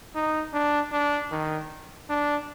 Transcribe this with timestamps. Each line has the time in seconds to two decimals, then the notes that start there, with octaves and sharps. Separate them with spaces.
0.15 D#4
0.54 D4
0.92 D4
1.32 D#3
2.09 D4